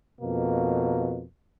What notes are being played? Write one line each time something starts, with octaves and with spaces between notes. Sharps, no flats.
F2 B2 A#3